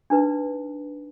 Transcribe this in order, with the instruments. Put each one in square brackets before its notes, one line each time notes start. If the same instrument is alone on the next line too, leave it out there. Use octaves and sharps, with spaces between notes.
[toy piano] D4 D#4 B4